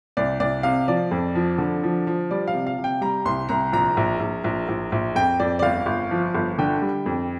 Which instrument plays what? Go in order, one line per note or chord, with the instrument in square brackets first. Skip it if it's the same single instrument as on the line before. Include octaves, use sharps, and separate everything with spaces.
[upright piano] C2 D5
C2 D5
C3 F5
F3 D5
F2
F3
D3
F3
F3
G3 D5
F5
C3
F5
C3
G5
G3 A#5
C2 C6
C2 A#5
A#1 A#5
A#1
A#1
A#1
A#1
A#1
F2 G5
F2 D5
D5
G1 F5
G1
F3
G1
D3 G5
G3
F2